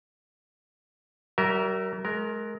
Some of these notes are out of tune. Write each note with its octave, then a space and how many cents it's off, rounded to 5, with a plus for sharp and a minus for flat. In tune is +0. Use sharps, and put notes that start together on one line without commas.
F#3 +45 A#4 +0 E5 -25
G#3 +35 A#4 +0